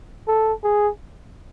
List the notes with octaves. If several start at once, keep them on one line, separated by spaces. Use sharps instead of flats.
A4
G#4